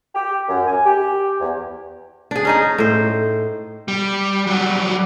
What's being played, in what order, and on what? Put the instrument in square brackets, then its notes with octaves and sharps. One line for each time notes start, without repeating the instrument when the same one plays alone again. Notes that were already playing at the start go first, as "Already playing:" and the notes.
[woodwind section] G4
F#2
G#5
G4
E2
[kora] D4 G#4
C#4 D#4 G#4
A2 C5
[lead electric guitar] G3
F#3 G3